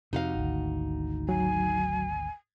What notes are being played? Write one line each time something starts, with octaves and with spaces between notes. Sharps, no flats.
F2 C3 D#4 F#4 F5
G#1 D2
F#3 G#5